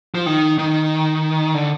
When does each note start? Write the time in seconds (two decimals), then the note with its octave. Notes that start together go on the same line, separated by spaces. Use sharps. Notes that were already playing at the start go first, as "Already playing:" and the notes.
0.15 F3
0.26 D#3
0.58 D#3
1.54 D3